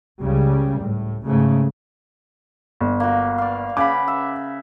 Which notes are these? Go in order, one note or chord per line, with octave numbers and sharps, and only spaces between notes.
C#2 C#3 G3
A2
G#2 C#3 A3
G1
A#3 F#4
D5 F5
C#3 F#5 B5 D6
E5